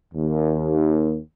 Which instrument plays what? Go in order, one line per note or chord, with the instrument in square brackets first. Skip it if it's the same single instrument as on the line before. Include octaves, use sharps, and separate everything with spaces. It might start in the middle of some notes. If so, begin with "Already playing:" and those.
[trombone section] D#2